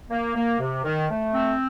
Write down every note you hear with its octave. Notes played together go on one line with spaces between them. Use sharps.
A#3
A#3
C3
D#3
A3
C4